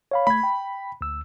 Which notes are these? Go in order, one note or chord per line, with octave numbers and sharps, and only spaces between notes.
C#5 F5 B5
A3 B5 G#6
G5
D2 E6